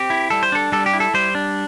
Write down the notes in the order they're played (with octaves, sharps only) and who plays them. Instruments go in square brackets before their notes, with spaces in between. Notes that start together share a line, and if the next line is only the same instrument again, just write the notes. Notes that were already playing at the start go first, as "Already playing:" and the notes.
Already playing: [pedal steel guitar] C4 G4
E4
G3 A4
C5
D4 A4
G3 A4
G4
E4
A4
G3 C5
D4